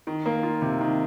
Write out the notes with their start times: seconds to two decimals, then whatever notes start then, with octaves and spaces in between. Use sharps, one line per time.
0.07 D#3
0.26 A#3
0.43 F4
0.62 C3
0.81 D#3